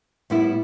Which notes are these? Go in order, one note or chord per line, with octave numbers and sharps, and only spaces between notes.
A2 G3 B3 E4